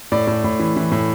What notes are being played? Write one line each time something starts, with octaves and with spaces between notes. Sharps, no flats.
A2 D5
A2
A2
E3
E3
A2